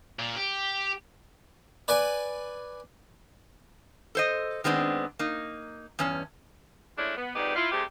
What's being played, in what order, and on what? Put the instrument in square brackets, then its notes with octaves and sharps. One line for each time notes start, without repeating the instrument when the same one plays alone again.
[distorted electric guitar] A#2
G4
[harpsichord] B4 D5 G#5
[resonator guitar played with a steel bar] A4 C5 D#5
D#3 G#3 B3 C4 D4
A#3 D#4
E2 G2 C#4 A5
[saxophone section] G#3 A3 C#4 D4 E4
B3
F2 G#2 D#4 G4 B4 D5
E4 F4
C3 G3 A3 G4 G#4 C5